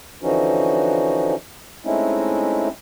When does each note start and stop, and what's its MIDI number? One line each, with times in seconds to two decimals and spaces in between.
0.22 1.35 50
0.22 1.35 52
0.22 1.35 53
0.22 1.35 61
0.22 1.35 63
0.22 1.35 66
1.85 2.69 56
1.85 2.69 57
1.85 2.69 60
1.85 2.69 61
1.85 2.69 63
1.85 2.69 64